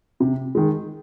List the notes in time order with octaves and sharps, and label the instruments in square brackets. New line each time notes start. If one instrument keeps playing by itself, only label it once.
[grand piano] C3
D#3 G#3